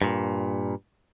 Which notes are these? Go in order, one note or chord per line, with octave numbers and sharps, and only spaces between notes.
G2 A#2